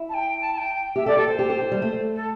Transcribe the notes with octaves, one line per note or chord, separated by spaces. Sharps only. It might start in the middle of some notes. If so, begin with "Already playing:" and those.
Already playing: E4
A5
G5
A5
A5
G5
G4 E5
A4 D5
G4 A4
A4 C5
G4
G4
E4
G3
A3
A4